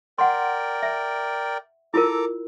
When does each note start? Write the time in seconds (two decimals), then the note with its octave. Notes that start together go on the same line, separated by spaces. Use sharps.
0.18 A#4 D5 F#5 G5 C6
0.83 E5
1.94 E4 F4 A4 A#4 A#5 D6